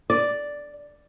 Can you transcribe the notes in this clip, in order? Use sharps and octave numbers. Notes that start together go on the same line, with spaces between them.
D5